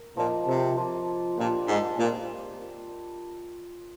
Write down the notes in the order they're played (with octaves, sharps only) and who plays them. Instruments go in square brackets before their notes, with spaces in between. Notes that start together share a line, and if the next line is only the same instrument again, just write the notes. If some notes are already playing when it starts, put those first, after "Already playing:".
Already playing: [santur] A#4
[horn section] A#2 [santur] F3 A#3 D#4
[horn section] C3
[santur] F3 A#3 F4
[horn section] A#2 [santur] D4 G4 A#4
[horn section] G#2
[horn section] A#2 [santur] G3 C4 F4 C5